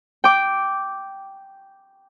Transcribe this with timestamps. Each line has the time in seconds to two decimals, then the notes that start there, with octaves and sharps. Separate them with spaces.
0.24 G5 D6